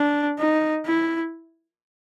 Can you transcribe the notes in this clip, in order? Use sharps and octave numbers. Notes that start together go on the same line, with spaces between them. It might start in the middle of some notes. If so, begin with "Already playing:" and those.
Already playing: D4
D#4
E4